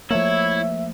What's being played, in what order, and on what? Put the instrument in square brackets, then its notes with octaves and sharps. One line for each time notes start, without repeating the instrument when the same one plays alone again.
[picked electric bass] F3 A3 A#3 [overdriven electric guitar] E4 [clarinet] C#5 [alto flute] E5